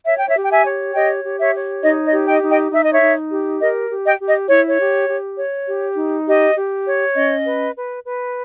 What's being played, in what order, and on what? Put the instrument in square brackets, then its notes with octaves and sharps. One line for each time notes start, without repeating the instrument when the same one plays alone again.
[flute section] C#5 E5
G5
C#5 E5
G4
G5
E5 G#5
C#5
G4 D#5 G5
G4
C#5 E5
C#5
D#4 D#5
D#5
G4
D#5 G5
D#4
D#5 G5
D#4 E5
D#5
C#5 E5
D#4
G4
A#4 D#5
G4
D#5 G5
G4
D#5
E4 C#5
C#5
G4
G4
C#5
G4
D#4
G4 D#5
G4
C#5
C#4 D#5
B4
B4
B4